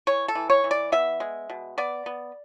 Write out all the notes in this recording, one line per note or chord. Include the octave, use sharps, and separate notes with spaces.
E3 C#5
A4
E3
C#5
E3
D5
B3 E5
G#3
B2
B3 D5
B3